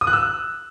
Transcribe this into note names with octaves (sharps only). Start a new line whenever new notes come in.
D#6
F#6
E6